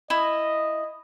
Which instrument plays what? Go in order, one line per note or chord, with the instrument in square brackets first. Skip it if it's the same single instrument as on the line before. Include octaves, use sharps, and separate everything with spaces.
[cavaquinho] E4 [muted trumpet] D#5